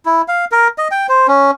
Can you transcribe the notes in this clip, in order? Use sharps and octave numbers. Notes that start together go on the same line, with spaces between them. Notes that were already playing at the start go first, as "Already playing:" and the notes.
E4
F5
A#4
D#5
G5
C5
C#4